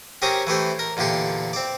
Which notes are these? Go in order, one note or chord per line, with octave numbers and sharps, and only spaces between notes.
C4 C#4 G4 G#4 A#4
E3 A3 G4 C5
A#4
E2 A#2 D3 G4 C6
C4 D5